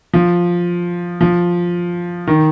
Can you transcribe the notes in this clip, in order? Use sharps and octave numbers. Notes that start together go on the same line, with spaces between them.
F3
F3
D#3